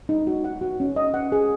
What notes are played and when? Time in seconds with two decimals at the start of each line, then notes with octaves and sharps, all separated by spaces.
0.09 D#4
0.27 F#4
0.44 F#5
0.61 F#4
0.80 C#4
0.96 D#5
1.14 F#5
1.32 G#4